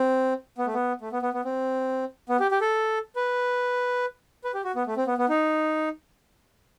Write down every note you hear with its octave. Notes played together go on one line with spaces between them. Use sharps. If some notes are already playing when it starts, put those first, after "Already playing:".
Already playing: C4
B3
A3
B3
A3
B3
B3
B3
C4
B3
G4
G4
A4
B4
B4
G4
F#4
B3
A3
C4
B3
B3
D#4